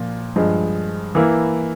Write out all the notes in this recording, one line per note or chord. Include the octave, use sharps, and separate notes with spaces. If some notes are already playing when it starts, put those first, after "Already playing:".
Already playing: A#2 F3 F4
G2 F3 G#3
E3 A#3 E4